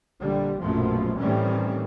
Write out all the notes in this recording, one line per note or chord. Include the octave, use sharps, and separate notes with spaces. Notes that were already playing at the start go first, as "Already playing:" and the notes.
A#1 D3 G3
A#1 F#2 B2 F3 A3
A2 D#3 E3 G3 C4 C#4